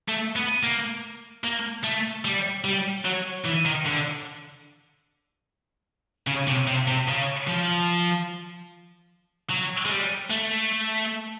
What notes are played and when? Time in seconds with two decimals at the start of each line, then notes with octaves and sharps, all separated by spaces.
0.09 A3
0.36 B3
0.63 A#3
1.44 A#3
1.84 A3
2.25 G3
2.64 G3
3.05 F#3
3.45 E3
3.65 D#3
3.85 D3
6.27 C#3
6.47 C3
6.67 C3
6.88 C3
7.08 C#3
7.48 F3
9.50 F#3
9.86 G#3
9.90 G3
10.31 A3